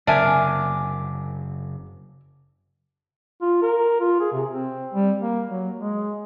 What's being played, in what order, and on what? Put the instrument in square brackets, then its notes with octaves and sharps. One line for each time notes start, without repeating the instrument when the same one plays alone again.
[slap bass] F#1 C3 [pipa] D4 [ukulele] A#4 E5 G#5
[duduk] F4
A#4
F4
G#4
C3
C4
G3
A#3
F#3
G#3